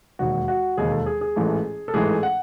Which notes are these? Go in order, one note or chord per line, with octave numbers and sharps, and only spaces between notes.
E1 D#2 D#3 F#4
F#4
E1 D#2 D#3 G#4
A4
G#4
G#4
A1 G#2 E3 A3
A4
A1 G#2 E3 A3 G#4
F#5